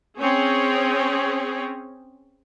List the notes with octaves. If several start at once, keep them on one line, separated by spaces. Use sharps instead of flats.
C4 C#4 G#4 C#5